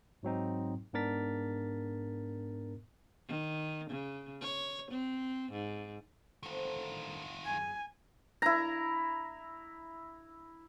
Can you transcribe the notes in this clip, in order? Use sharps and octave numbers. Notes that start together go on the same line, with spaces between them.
G#2 F#3 C4 D#4
G#2 B3 D4 A#4 A6 B6
D#3
C#3
C#5
C4
G#2
D3 D#3 A3 C4 F4
F#2 C#3 G#5
E4 A#5